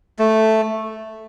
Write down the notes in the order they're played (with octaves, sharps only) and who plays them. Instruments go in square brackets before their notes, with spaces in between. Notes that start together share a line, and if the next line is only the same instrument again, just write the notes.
[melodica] A3